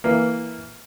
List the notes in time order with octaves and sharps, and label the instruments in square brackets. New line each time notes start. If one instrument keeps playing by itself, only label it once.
[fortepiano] E3 A#3